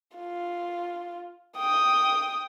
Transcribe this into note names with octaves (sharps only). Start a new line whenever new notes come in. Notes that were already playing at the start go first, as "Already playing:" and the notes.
F4
G5 D#6